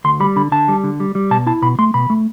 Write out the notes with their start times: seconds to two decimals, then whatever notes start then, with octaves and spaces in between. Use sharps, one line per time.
0.04 D2 C6
0.20 G3 B5
0.36 D3 B5
0.52 D3 A5
0.68 G3
0.84 D3
1.00 G3
1.15 G3
1.31 B2 A5
1.46 E4 A5
1.62 B2 B5
1.79 A3 C6
1.94 B2 B5
2.10 A3